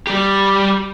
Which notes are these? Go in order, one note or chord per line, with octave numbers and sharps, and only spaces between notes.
G3 G4